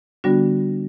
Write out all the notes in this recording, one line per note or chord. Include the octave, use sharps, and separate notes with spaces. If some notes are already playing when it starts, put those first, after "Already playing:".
D3 G3 B3 D4 F#4